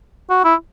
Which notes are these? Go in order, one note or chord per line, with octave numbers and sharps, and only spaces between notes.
F#4
E4